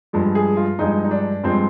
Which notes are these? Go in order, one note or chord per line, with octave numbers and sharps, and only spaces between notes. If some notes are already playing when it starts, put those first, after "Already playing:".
G2 F3 G#3
G#4
F4
G2 F3 G#3 D#4
D#4
D4
G2 F3 G#3 C4